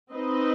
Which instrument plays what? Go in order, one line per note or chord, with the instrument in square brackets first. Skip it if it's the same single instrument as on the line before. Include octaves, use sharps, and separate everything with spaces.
[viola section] C4 D#4 B4 D#5